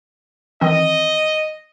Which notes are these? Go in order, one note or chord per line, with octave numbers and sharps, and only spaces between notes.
D#3 E3 C4 D#5